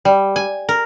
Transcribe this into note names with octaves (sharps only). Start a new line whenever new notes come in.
G3
G#5
A#4